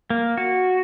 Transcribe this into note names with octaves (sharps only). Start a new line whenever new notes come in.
A#3
F#4